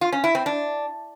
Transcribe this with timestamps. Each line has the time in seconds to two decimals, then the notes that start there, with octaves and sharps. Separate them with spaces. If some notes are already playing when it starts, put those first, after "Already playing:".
0.01 F4
0.13 C#4
0.24 E4
0.35 C4
0.46 D4